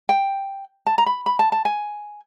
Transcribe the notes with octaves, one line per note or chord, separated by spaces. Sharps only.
G5
A5
A#5
B5
B5
A5
A5
G#5